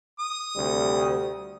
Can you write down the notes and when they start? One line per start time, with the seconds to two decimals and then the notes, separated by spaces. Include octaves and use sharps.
0.19 D#6
0.56 D2 C3 G3